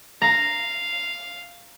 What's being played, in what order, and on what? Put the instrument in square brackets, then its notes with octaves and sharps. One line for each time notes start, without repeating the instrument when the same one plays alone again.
[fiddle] F5 [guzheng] A#5